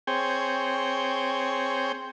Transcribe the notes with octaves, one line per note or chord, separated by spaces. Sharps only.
C4 G#4 C#5 G5